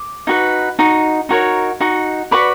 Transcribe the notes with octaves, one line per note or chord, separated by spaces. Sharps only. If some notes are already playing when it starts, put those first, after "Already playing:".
Already playing: D6
D#4 F#4 B4
D#4 F#4
D#4 F#4 A#4 C#5
D#4 F#4
F#4 B4 D5 B5 C#6